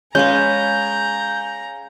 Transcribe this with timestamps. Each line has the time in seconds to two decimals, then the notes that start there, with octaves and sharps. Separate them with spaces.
0.15 G#3 C#4 G#4 B4 F5 A#5 G6